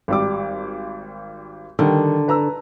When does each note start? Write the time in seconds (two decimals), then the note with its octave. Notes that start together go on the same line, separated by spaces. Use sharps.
0.08 G#1 G3 D6
1.79 D3 D#3 G3
2.28 B4 A#5 E6